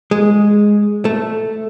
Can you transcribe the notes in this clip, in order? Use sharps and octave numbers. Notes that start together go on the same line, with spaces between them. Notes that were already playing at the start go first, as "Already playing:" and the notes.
G#3
A3